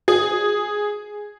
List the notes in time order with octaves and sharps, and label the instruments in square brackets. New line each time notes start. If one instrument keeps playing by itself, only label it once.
[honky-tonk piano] G#4